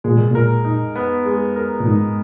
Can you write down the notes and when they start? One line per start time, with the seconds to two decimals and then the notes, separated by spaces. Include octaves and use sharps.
0.04 A#2 G#3
0.18 B2
0.31 A#2 A#4
0.65 D#4
0.96 B3
1.25 G#3
1.56 A#4
1.81 A#2
1.86 G#2 D#4